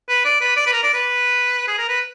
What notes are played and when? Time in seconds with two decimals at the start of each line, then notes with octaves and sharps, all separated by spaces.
0.09 B4
0.25 D5
0.41 B4
0.57 D5
0.66 B4
0.73 A#4
0.83 D5
0.94 B4
1.68 G#4
1.78 A#4
1.89 B4